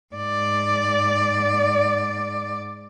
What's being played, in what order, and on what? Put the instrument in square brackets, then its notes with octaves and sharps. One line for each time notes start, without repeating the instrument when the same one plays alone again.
[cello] G#2 D5